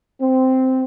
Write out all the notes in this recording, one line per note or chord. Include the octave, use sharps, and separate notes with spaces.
C4